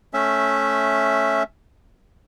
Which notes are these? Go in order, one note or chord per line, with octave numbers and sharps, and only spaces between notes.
A3 C#4 E5